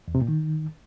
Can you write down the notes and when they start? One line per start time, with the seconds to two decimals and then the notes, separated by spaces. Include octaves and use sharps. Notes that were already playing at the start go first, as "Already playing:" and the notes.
0.08 E2
0.15 C3
0.22 A#2
0.28 D#3